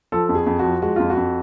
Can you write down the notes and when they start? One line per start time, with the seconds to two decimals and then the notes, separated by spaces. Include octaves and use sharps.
0.12 F3 A4
0.29 F2
0.35 G#4
0.46 F2
0.59 F3 F#4
0.82 G#3 F#4
0.96 F2 F4
1.10 F#4
1.17 F2